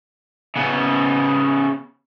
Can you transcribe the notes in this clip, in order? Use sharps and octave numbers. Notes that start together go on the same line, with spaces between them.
C#3 B3